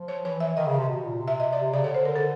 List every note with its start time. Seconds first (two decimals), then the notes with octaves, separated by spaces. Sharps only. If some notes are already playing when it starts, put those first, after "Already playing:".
Already playing: F3
0.08 C#5
0.24 E3 C#5
0.40 E5
0.56 D#3 D#5
0.66 C#3
0.78 C3
0.88 B2
1.04 A#2
1.20 C3
1.28 E5
1.40 D#5
1.53 D5
1.62 C3
1.74 C#3 D5
1.84 D3 C#5
1.94 C5
2.05 A#4
2.16 A4